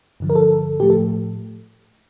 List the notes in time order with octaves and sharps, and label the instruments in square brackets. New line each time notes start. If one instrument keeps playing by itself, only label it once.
[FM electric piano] G2 D3 F3
A#4
A4
A2 F3 A3 G4
A4